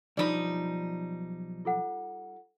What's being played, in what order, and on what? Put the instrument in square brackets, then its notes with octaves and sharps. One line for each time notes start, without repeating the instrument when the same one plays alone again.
[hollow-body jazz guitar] B1 F3 B5 [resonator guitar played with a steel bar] G3 D#4 [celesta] D5
[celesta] F4 A4 F#5